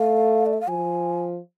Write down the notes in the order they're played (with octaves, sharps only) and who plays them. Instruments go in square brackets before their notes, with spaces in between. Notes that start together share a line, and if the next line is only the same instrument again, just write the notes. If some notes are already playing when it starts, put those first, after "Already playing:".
Already playing: [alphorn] A3 [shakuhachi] F5
[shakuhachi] D5
E5
F5
[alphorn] F3 [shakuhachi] G#5